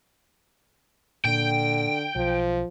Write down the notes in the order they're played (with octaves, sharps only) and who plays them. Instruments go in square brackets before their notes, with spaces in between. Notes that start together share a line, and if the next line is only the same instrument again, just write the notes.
[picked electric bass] A#2 [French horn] D3 [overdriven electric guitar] G5
[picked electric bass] B1 [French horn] F3